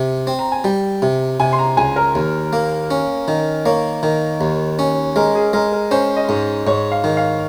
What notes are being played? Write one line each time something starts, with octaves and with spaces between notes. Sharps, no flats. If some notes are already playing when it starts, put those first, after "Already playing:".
Already playing: C3
C4
A#5
G#5
G3 G5
C3
C3 G#5
C6
A#5
C#2 G#5
A#4
D#2
A#3
C#4
D#3
A#3 C#5
D#3
D#2
C#4
G#3 A#4
G#4
G#3 A#4
A#4
C#4 C5
D#5
G#2
G#2 C#5
F5
D#3
F5